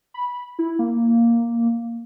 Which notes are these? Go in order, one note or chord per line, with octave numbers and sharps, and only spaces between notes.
B5
E4
A#3